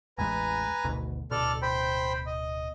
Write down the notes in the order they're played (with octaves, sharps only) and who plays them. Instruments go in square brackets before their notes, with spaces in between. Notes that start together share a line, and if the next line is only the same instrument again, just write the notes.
[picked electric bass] A1 E2 G#3 [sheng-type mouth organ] B4 G#5 A#5
[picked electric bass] G#1 D2 B2
[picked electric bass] D1 B2 [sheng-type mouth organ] A4 D5 F6
[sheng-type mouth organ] C5 G5 B5
D#5